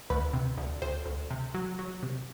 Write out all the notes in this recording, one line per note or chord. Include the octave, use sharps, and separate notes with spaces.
D2 B4
C3
D2
D2 C5
D2
C3
F#3
F#3
C3